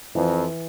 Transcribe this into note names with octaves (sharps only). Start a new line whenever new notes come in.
F2 E3